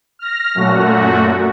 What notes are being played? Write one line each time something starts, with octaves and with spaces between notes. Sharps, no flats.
F6 A#6
F#2 A#2 A3 F#4